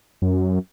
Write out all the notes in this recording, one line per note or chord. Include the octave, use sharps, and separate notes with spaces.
F#2